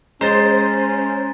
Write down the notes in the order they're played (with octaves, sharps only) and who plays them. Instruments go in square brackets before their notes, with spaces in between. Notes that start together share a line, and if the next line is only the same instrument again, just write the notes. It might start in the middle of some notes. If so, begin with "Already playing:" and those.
[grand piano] G#3 [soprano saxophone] C#4 [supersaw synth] C5 [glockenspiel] A#5 A6